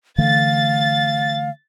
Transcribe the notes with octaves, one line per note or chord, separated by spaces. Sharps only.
D3 E3 A3 F5 A6